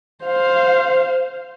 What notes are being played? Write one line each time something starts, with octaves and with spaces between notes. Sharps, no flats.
C5 F5